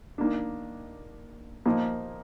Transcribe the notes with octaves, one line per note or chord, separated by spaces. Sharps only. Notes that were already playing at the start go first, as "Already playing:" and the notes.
D#3 A#3 D4
A#2 F3 A#3 D#4